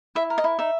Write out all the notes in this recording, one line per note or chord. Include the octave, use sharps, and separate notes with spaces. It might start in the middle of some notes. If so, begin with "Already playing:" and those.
E4 E5
A#4
D#5
E4
D#4 E5